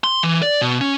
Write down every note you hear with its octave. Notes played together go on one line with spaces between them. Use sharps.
C6
E3
D5
B2
C#4